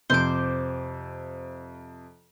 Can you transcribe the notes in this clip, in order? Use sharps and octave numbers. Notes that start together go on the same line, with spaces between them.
F2 C3 C5 D6